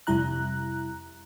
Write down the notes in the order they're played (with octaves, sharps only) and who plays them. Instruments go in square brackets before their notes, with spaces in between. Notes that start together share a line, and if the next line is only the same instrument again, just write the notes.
[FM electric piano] F2 C3 G3 E4 A#5 F#6